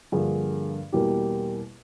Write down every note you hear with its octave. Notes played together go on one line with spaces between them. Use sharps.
G2 D3 F3 A#3 G#4
E2 B2 G3 A#3 G4